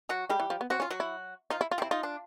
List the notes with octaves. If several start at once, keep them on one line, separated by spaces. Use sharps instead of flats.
F#3 F#4
G3 G#3 G4
E3
F3
B3
F#3 C4 F#4
C#4 F4
F#3 F#4
E4
F3 D#4 F4
E4
F4
C3 C4 E4
D#4 F4
D4